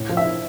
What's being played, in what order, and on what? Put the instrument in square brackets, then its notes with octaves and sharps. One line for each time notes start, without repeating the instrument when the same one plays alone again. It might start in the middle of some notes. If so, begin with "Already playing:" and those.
Already playing: [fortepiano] A2
F3
E5
E4